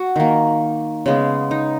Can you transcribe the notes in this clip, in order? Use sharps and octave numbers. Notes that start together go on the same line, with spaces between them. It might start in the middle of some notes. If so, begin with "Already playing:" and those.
Already playing: F#4
D#3 A#3
C#3 G#3 B3
D#4